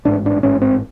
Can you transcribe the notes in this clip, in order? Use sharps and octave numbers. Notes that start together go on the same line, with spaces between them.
A1 G#2 D4
D4
A1 G#2 C#4
C4